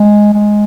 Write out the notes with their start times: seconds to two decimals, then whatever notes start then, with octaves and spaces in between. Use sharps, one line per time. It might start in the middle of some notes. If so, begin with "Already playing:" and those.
Already playing: G#3
0.33 G#3